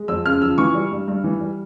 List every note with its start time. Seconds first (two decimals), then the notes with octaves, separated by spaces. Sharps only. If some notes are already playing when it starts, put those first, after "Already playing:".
Already playing: G#3
0.08 F2 E6
0.26 C#3 F6
0.42 F3 E6
0.58 E3 C#6
0.74 G3
0.92 G2
1.08 G2
1.24 E3
1.40 G3